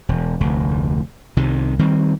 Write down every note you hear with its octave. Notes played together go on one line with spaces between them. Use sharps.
E1
F1 D2
C2 C3 D#3
D#3 G3 C4